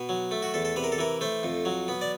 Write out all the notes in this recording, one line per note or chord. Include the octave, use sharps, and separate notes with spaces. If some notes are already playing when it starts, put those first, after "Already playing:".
Already playing: B2
F#3
A3
F#4
E2 A4
A4
C3 B4
A#4
A4
E3 A#4
A3 C5
F2
F#3
B3
D5